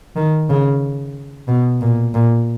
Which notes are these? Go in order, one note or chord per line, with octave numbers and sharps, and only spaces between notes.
D#3
C#3
B2
A#2
A#2